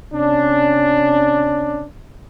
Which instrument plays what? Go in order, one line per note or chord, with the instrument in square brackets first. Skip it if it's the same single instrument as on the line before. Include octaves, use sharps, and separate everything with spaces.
[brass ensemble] C3 C#4 D4